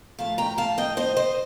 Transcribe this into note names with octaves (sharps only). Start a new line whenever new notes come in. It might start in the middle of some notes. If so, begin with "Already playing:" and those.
A2 F3 A3 F5 A5
G5 A#5
F5 A5
D#5 G5
C5 D#5
C5 D#5